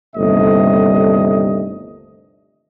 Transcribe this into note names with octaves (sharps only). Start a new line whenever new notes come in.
G1 D#2 C3 G3 A3 D#5